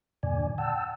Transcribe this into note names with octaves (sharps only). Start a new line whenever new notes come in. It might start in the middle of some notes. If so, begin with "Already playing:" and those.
E2 G2 A#2 D3 D5 G#5
F#5 G5 A5 E6